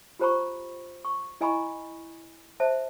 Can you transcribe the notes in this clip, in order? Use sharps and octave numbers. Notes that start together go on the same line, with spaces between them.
F4 G4 C5 A#5 B5 C#6
C#6
E4 D#5 G#5 A#5 B5 C#6
C5 E5 A5